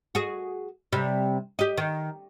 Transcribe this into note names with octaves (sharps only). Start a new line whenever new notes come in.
F#4 G#4
C3 G3
G4 D#5
D#3